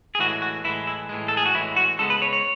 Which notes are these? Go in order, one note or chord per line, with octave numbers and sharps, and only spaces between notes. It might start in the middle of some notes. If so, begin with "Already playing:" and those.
G#4
A2 E3 G#3 F#4
F#4
A2 E3 G#3 E4
E4
A2 E3 G#3
A4
G#4
F#4
A2 E3 G#3 E4
F#4
C#3 G#3 B3 A4
B4
C#5
C#5